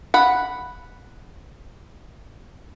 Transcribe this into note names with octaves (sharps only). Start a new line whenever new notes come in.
F#5 B5